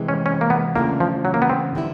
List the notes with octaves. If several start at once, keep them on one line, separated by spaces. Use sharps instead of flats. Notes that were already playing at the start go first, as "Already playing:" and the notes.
Already playing: C3 E3 G#3 C4
C#4
C#4
A#3
B3
C#3 E3 A3 A#3 D4 F4
F3
F#3
A#3
B3
C4
D3 G3 B3 E4